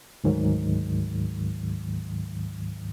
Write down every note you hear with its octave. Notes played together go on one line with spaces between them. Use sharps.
D2 G#2 D#3 F#3